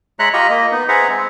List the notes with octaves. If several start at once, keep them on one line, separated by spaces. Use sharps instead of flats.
G#3 C#5 E5 A#5 F#6
F4 G4 D#5 A#5 B5 C#6
A#3 D#5
B3 D#4
G#4 B4 C5 E5 F#5 A#5
G#3 C4